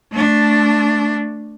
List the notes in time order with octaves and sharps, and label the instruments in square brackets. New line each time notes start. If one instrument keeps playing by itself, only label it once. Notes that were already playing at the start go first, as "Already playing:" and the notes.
[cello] A3 D4